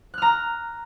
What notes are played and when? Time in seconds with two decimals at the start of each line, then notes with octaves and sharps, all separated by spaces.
0.14 F#6
0.18 F6
0.22 A#5